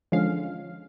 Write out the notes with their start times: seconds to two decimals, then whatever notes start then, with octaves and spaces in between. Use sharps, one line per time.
0.12 D3 F3 G#3 C#4 F5